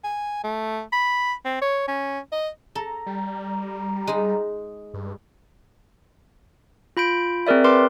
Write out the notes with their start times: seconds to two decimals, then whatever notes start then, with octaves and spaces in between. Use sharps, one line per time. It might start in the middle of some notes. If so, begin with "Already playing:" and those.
0.04 G#5
0.44 A3
0.93 B5
1.45 C4
1.61 C#5
1.88 C#4
2.32 D#5
2.75 A4 A#5
3.07 G3
4.07 G#3 D#4
4.94 G2
6.97 F4 B5 G6 D7
7.47 C4 G#4 A#4 D5 E5
7.64 A#4 B4 C6 D6